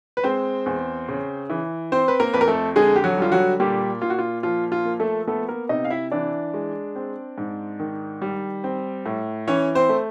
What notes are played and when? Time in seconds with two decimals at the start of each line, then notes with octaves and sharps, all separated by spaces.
0.17 B4
0.23 G#3 C4 C5
0.66 E2
1.08 C#3
1.50 E3
1.92 C4 C5
2.08 B4
2.20 A#3 A#4
2.33 F2 B4
2.41 A#4
2.48 A3 A4
2.76 D3 G#3 G#4
2.96 G4
3.04 F#3 F#4
3.18 G3 F4
3.32 F#3 F#4
3.60 A#2 G3 G4
4.02 A#2 F4
4.10 F#4
4.19 F4
4.43 F3 F4
4.72 F4
4.85 A#3
5.00 A3 A4
5.28 A3 B3 A4
5.49 A#3 A#4
5.69 C3 D#4 D#5
5.85 F5
5.90 E4 E5
6.11 E3 D4 D5
6.54 G#3
6.96 C4
7.38 G#2
7.79 D#3
8.22 G3
8.64 C4
9.06 A2
9.47 E3 C#4 C#5
9.75 C4 C5
9.89 A3